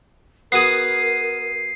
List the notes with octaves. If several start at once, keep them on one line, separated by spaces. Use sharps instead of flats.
B3 F#4 G#4 A#4 C7 D#7